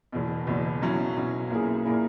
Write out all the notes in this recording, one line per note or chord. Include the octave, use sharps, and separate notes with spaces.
F#1 E2 B2
F#1 E2 B2
B1 B2 F#3 C#4 E4
B1 B2 F#3 C#4 E4
B1 A#2 A#3 E4 G#4
A#2 A#3 E4 G#4